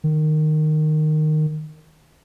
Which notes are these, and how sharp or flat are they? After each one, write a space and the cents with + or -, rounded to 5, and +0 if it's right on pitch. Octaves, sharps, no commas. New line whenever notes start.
D#3 -15